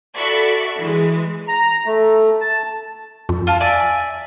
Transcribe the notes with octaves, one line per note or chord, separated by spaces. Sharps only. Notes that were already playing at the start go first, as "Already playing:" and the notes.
F#4 A4 D5 E5 B5 C#6
E3 G#3
A#5
A3
A5
F2
F4 A5
D5 E5 G#5